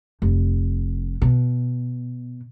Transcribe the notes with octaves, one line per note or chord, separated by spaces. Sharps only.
F1
B2